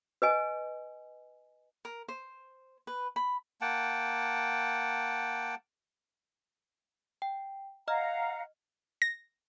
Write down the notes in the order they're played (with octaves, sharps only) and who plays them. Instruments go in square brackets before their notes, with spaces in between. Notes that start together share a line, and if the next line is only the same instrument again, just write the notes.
[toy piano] B4 D#5 G#5
[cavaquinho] A#4
C5
B4
B5
[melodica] A#3 F#5 G5 A5
[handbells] G5
[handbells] D#5 F6 [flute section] F5 F#5 A#5
[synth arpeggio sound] A#6